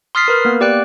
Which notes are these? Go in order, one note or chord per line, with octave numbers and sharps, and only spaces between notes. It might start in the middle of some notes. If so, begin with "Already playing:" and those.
C6 D#6 F6 A6 B6 C7
A#4 B4
A#3 B3
G4 D5 G5 F#6